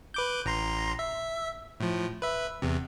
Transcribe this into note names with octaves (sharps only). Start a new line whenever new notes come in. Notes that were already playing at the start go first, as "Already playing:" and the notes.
B4 D6 G6
A1 A#5 C6
E5
A2 F3
B4 E5
E2 C3